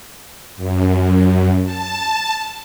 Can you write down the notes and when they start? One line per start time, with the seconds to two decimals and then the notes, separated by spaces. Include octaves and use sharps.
0.57 F#2
1.65 A5